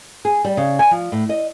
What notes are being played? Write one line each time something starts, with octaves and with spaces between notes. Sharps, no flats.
G#4
G3
C#3
G#5
F3
A2
D#5